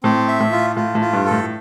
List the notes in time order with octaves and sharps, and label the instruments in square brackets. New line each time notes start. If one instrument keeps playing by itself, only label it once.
[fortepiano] A2 [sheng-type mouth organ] C4
[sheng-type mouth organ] E5
[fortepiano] A2
[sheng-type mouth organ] F4
[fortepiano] A2 [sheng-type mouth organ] F4
[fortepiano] A2
[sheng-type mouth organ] F4
[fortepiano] G2
[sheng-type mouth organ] A4
[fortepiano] A2